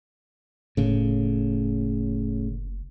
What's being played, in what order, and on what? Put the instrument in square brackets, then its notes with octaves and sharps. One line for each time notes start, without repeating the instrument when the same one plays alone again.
[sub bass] F#1 [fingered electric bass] A2 C#3